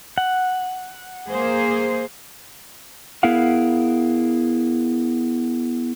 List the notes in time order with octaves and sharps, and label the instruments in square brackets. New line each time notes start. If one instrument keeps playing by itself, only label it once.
[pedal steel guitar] F#5
[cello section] A#3 G#4 C5
[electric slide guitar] B3 E4 G#4 A#4 F5 F#5